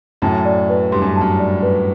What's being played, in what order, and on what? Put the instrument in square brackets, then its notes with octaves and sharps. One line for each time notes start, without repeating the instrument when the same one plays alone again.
[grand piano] F#2 A2 [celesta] A5
[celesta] D5
B4
[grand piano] G2 [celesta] C6
[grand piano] F#2
[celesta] A5
[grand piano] F#2
[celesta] D5
B4